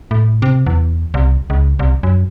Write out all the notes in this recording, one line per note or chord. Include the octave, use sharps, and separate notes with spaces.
A2
C3
E2
C2
C#2
C2
F#2